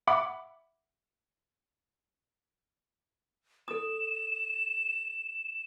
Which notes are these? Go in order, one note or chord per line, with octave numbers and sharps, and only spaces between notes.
E5 F#5 B5 D6
A4 D#6 E7